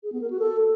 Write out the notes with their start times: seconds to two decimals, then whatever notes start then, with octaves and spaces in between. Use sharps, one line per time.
0.03 G#4
0.12 B3
0.21 A#4
0.30 F#4
0.39 A4